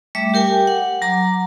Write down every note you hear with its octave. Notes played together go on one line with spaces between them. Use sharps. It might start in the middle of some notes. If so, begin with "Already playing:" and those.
G3 A3 E5 D6
G4 A#4 G5 G#5
F#5
F#3 A#5 D6